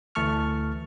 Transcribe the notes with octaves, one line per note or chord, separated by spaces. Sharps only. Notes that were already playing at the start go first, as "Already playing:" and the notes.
D2 E3 A3 A5 C#6 F6